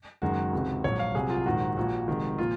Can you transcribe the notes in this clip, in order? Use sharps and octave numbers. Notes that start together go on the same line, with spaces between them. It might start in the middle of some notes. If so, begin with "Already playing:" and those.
F#1 F#2 D#3 G#3 F#4
C#2 C3 D#3 G#3
A#1 G#2 F#3 C#5
F5
C2 C3 F#3 G#4
F4
A#1 G#2 D#3 G#3 F#4
A#1 A#2 F3 F#4
F1 F2 D#3 G#3
A#2 F3 F4